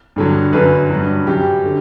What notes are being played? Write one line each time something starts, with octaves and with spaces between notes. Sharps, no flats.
G2 D3 F#3
F#2 D3 F#3 B4
G2 F#3
F#2 F#3 G4
D3